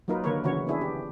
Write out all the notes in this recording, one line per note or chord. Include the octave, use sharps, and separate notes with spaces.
F#3 A#3 D#4 F4 A#4 B4
D3 D#3 A#3 A#4 B4 C#5
C#3 E3 E4 F#4 C#5
B3 D4 E4 G#4
G4